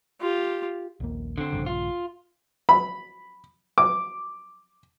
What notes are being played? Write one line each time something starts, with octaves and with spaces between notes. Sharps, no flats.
F4 G4
A#1 D#2 A#3
D3 C4
A#1 G2 C#3
F4
B5
D6